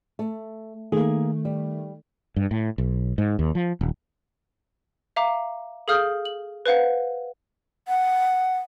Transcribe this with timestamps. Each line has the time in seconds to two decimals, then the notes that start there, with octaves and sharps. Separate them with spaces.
0.19 A3
0.92 D#3 A3 A#3 G#4
1.45 G3
2.36 G2
2.51 A2
2.78 B1
3.18 G#2
3.39 D#2
3.55 F3
3.81 D#1
5.16 E5 F5 A#5 D6
5.88 G#4 A4 F5 D#6 F6 G6
6.25 F#7
6.66 B4 C5 F5 F#5
7.88 F#5